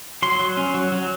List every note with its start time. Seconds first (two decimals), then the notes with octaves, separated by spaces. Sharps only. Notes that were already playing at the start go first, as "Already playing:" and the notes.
0.22 F#3 C6
0.39 F#3
0.57 C#4
0.74 F#3
0.92 F#3